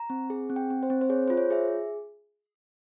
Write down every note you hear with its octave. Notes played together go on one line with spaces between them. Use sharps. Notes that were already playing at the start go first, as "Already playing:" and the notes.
Already playing: A#5
C4
G#4
C4
G5
C4
C5
C4
C5
G#4 C#5
F4 C5
C#5
G#4 E5